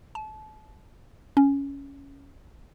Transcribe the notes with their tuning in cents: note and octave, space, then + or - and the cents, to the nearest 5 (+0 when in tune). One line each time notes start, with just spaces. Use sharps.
A5 -30
C#4 +5